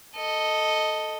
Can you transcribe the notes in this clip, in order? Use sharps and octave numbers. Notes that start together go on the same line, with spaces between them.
A4 D#5